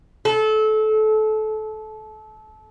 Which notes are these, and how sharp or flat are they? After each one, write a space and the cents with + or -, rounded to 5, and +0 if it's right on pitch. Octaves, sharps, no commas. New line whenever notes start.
A4 -25